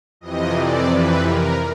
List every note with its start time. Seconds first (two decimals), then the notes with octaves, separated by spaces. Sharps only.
0.21 F2 C3 E3 D#5
0.55 D5
0.89 B4
1.23 A#4